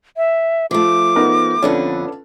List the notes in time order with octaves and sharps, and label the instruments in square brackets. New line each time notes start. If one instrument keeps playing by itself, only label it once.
[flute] E5
[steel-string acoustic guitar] F3 A3 [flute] D6
[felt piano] B3 D#4 A#4
[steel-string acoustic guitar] F2 D3 B3 [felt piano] C#4 D4 A4